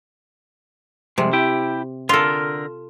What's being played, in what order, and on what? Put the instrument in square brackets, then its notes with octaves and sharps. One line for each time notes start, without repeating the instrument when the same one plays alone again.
[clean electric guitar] C2 F2 G#3 [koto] C3
[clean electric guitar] E4 G4 G5
[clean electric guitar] D3 A#4 [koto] F4 A4